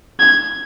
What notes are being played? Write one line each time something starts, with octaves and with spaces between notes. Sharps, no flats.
G#6